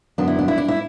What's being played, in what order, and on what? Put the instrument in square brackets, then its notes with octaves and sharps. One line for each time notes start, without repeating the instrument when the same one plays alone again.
[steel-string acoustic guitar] F#2 D3 F#3 B3 D4
E4
D4
E4
D4
E4